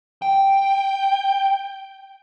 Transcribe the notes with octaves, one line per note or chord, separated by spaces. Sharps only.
G5